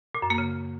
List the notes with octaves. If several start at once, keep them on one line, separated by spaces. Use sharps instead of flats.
A#2
F#2
A#3
C#3